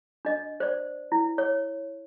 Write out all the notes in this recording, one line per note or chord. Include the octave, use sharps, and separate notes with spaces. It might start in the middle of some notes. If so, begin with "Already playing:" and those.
D4 D#5
C5 D5
E4
C#5